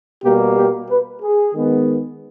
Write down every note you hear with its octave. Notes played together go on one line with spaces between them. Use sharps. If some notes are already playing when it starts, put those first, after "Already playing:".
B2 G3 A#3 G4
G4
B4
G#4
D#3 G#3 B3